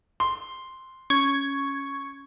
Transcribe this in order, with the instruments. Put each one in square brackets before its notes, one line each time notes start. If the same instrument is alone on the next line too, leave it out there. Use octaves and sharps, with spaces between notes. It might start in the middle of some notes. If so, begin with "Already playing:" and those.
[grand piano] C6
[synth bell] C#4 [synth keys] C#6 G#6